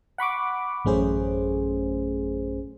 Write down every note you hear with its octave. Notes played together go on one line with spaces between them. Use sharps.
F#5 B5 C#6 D6
A1 F#2 A3 C#4 G#4 C5